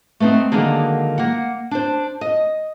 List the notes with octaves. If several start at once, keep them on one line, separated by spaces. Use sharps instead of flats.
A3 B3 C4 D#4
D3 D#3 F#3 G#3 A#3 D4
A#3 F#5
D4 C5
D#5